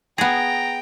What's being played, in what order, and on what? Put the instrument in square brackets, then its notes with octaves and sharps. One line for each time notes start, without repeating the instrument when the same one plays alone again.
[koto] B3 G#4 [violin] G5 [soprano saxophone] A#5